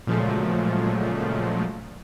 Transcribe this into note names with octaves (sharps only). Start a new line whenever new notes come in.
A#2 C#3 F3 F#3 G#3 A3